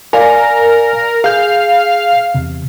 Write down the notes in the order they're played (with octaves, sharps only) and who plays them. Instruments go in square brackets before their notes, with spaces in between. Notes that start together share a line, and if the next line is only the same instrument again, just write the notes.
[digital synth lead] A#4 [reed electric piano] D5 F5 G#5
[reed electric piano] G#4 G6 [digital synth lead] F5
[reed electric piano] E2 C3